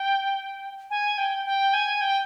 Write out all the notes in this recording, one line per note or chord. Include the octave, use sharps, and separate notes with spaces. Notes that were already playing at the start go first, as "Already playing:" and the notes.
Already playing: G5
G#5
G5
G5
G#5
G5